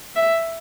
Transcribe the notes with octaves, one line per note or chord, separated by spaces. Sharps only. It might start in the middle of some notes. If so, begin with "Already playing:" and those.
E5